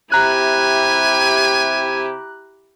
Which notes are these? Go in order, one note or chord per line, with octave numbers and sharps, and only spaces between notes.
C3 E4 G4 G#5 A#5 F#6